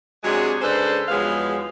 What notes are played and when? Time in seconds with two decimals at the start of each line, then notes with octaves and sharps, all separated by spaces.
0.23 C3 F#3 G#3 D4 G4 G#4
0.62 C#3 G#3 D4 A4 B4 C5
1.09 E2 F3 F#3 G#3 B4 F5